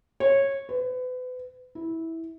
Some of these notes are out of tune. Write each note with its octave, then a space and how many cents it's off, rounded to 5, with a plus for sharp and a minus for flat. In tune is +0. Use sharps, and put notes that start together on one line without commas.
C#5 -15
B4 +35
E4 -15